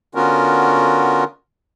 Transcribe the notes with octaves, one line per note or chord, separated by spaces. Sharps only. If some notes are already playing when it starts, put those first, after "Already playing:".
D3 B3 C#4 F4 F#4 A#4